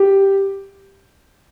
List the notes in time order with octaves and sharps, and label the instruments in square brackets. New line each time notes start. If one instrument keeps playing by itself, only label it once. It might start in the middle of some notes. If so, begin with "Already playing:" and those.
Already playing: [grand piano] G4